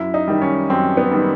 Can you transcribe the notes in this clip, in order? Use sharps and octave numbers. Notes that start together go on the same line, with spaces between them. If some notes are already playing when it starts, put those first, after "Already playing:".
Already playing: F#2 E4
D#4
D#3 G3
C#4
F#2 C4
B3
D#3 G3